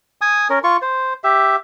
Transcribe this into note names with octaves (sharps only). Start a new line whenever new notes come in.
G#5 D#6
C#4 A#4
F4 C#6
C5
G4 E5